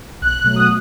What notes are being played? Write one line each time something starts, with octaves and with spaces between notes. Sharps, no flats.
B1 F#6
B2 F#3 A3
D#6